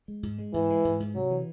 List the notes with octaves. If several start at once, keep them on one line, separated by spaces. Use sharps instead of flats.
G#3
G#2
G#3
G#2 E3
G#3
G#2
G#2
C3 F#3
E3